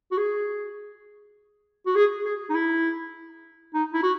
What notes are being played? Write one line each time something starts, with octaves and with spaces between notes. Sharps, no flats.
F#4
G#4
F#4
G#4
G#4
D#4
E4
D#4
E4
F#4